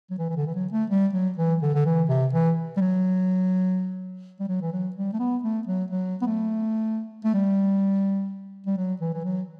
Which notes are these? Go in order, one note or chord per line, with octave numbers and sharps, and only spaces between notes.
F#3
E3
E3
D3
E3
F#3
A3
G3
F#3
E3
D3
D3
E3
C3
E3
G3
F#3
G3
F#3
E3
F#3
G3
A3
B3
A3
F#3
F#3
B3
A3
A3
G3
G3
F#3
E3
E3
F#3